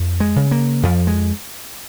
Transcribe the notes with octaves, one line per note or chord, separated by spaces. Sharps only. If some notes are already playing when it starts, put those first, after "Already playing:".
Already playing: F2
G#3
C#3
A#3
F2 F3
G#3